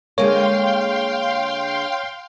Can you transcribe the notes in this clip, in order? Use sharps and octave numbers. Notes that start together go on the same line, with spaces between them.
D3 G#3 A#3 C#5 F5 G5 C6